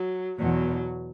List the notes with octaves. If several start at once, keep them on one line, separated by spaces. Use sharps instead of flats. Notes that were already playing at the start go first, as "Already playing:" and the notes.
Already playing: F#3
E2 B2 F#3